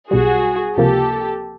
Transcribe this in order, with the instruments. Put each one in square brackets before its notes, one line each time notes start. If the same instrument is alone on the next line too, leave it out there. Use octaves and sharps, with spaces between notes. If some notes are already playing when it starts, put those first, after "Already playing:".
[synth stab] B1 B2 G3 [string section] F#4 G#4
[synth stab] C#2 C3 F3 A#3 [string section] G4 A4